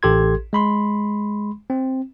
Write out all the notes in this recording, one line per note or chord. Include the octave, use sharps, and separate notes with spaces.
A1 G4 A4 C6 G#6
G#3 B5 C6
C4